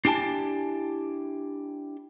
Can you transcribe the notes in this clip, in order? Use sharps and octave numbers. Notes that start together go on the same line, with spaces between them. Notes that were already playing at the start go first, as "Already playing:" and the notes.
D4 E4 G4 G#5 A5